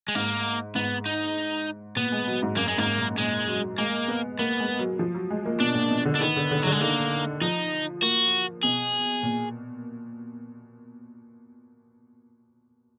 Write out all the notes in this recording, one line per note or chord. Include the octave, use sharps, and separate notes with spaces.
G#3
G#2 A#3
G#2 B3
D#4
A#2 B3
G#3
F#3
G#2
F#2 A#3
G#3
G#2 A#3
A#2
A#2 G#3
F#3
G#3 A#3
B3
A#3 B3
G#3
F#3
F3
F#3
G#3
A#3
B2 D4
A#2
B2
D3
D4
D#3 B3
D3
D3
D3 F#3
G#3
D#3 A#3
F3 D#4
A#3 F#4
B2 G#4
A#2